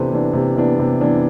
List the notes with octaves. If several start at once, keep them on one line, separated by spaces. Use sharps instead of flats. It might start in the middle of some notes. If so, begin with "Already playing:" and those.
Already playing: C3 E3 B3 D4 A4 B4 C5
E3 B3 D4
C3
E3 B3 D4
C3
E3 B3 D4